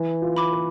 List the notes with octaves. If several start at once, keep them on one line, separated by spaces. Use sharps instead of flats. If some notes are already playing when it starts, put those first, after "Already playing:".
Already playing: E3
F4
B5 D6
B4